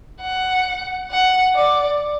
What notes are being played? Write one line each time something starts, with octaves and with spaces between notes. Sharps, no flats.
F#5
F#5
D5